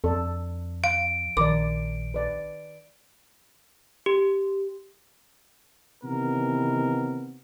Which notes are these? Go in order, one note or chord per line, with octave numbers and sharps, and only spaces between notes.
F2 A4 D5
F5 D7
A#1 D#3 A#4 D5 D6
B4 D5
G4
C3 D#3 E3 B3 A#4